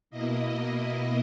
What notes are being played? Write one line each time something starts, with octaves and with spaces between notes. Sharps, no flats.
B2 A#3 E4 D#5